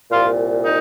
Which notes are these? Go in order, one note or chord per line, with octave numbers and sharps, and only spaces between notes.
C2 A#2 F4
D#4